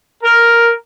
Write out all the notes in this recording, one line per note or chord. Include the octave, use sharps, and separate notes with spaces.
A#4